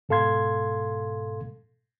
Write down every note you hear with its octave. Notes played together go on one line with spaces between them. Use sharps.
G#2 B2 A4 F5 C6 G#6